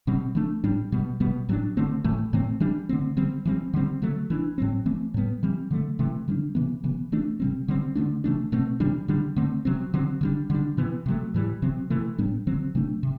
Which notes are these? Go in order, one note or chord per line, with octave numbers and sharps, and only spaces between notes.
B2 G3 C4
E3 A3 D4
A2 G3 D4
B2 G3 B3
B2 G3 B3
A2 F#3 A3 D4
D3 A3 C4
A2 E3 A3
A2 E3 A3 C4
E3 G3 D4
D3 A3 C4
D3 G3 C4
E3 G3 C4
D3 G3 C4
D3 F#3 A3
E3 B3 D4
A2 F#3 C4
E3 A3 C4
A2 G3 B3
E3 G3 C4
D3 F#3 A3
C3 E3 A3
D3 G3 B3 D4
C3 E3 B3
C3 E3 B3
E3 A3 D4
C3 G3 C4
D3 G3 C4
D3 F#3 A3 D4
C3 E3 A3 D4
B2 A3 C4
C3 E3 G3 D4
D3 G3 D4
D3 A3 C4
C3 F#3 C4
D3 F#3 C4
D3 G3 D4
D3 G3 D4
C3 E3 B3
C3 F#3 A3
A2 E3 G3
C3 F#3 C4
C3 E3 A3
A2 G3 B3 D4
D3 F#3 C4
C3 F#3 A3 D4
C3